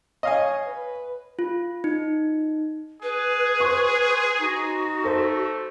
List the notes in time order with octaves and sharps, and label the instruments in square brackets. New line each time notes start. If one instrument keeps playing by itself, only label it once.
[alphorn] C#5 [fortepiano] D#5 F5 G#5
[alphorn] B4
[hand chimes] F4
D#4
[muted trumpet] G#4 [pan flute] B4
[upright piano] C5 C6 C#6
[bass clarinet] D#4 [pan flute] F#4
[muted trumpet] A3 [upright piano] A4 C5